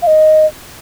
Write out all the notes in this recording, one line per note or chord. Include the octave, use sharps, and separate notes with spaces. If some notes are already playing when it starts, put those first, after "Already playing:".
F5
D#5